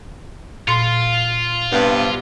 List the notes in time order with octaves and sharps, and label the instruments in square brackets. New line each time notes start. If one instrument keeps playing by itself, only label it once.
[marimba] A#2 C6 [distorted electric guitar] F4
[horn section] G2 C3 B3